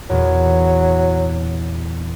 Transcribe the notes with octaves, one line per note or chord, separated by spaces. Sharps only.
E2 A#2 F#3